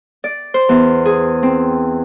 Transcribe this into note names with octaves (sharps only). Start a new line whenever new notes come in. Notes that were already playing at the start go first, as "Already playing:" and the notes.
D5
C5
E2
G#4
C4